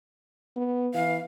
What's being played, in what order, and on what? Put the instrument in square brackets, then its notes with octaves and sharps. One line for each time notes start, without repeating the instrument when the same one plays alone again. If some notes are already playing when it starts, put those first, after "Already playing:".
[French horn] B3
[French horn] E3 [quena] F5